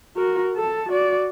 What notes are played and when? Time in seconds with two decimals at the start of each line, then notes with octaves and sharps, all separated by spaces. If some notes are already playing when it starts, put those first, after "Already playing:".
0.17 F#4 A#4
0.55 A4 A5
0.90 F#4 D5